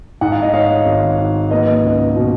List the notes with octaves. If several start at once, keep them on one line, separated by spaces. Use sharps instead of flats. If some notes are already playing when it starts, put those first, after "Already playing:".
G#2 F#5
F5
D#5
G#2 C#5 F5
G#1
G#2
A#3 B4 D#5
C#2
B2